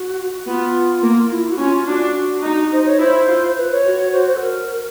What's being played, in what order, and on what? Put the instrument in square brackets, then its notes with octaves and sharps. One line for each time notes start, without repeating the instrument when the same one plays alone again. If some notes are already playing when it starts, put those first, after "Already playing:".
Already playing: [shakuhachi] F#4
[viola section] B3 [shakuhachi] F4
[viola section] A#3
[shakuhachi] E4
F#4
[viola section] C#4 [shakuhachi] F4
[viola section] D4 [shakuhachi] F#4
[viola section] D#4
[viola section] D#4 [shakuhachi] C5
[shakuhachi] C#5
[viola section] E4 [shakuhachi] C5
[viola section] F4
[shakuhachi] B4
C#5
[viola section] F#4
[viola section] F#4 [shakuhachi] C5
[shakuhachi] C5
A4
A#4